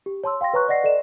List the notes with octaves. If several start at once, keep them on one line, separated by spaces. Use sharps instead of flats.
G4
C#5 A5 C6 E6
F5 G5 C6 A#6
B4 C#5 A#5 C#6 F#6
D5 D#5 F#5 A#6 C7
A4 D5 D#5 E7